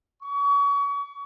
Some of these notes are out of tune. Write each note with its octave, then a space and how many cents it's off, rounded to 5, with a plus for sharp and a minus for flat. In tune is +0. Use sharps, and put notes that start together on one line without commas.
C#6 +35